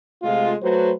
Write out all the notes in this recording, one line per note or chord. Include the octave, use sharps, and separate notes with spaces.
C3 G#3 A3 F4
F#3 A3 F#4 B4 C5